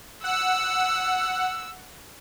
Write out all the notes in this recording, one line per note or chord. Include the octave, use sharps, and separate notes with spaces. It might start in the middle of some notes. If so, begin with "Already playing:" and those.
F#5 E6